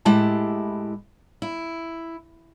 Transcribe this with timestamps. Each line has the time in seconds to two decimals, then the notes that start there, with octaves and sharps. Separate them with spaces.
0.05 A2 G#3 E4 G4 A5
1.42 E4